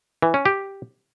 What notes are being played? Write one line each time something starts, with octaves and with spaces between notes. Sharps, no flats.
E3
C#4
G4